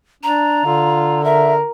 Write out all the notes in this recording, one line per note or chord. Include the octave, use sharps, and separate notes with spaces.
D4 A#5
D3 F4
A#4 E5